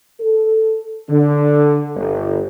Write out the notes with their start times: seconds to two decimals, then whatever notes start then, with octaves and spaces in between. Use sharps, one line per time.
0.20 A4
1.09 D3
1.96 G1